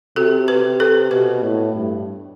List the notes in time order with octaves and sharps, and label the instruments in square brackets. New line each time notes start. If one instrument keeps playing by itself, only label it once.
[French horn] C3 [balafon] F#4 A4
[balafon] G4 B4
[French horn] C3
[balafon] A4 C5
[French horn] B2 [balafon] G4 B4
[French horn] A2
G2